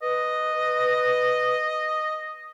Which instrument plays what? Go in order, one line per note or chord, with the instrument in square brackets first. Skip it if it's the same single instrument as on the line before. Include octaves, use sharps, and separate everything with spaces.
[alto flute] B4 [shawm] D#5